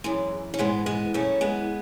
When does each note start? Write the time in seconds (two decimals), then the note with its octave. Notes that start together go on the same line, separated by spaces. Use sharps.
0.04 F#2 E3 G#3
0.54 C#4
0.59 G#2 E3 G#3 B3
0.86 G#3 B3
1.14 F#2 E3 A3 C#4
1.41 G#3 B3